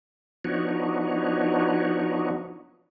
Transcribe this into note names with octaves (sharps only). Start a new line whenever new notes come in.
F3 B3 D4 D#4 F#4 C#5